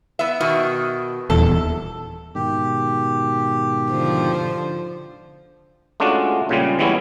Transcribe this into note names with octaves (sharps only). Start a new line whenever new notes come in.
B3 E5
B2 D#3
D#1 E2 A4
G#2 B2 D#3 G4
D3 F3 C5
G#3 A3 C#4 D4 F4 F#4
A#2 C#3 G3 G#3
E3 G3 G#3 B3 C#4 E4